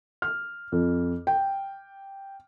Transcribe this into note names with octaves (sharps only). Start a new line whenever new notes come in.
F6
F2
G5